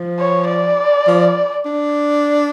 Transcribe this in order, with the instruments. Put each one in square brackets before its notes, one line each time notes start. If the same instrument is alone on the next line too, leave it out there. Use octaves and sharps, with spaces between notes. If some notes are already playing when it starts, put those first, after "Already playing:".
Already playing: [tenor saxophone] F3
[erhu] C#5
D5
[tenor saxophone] F3
D4